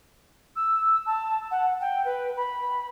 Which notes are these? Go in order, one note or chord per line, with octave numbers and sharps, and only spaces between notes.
E6
A5
F#5
G5
B4
B5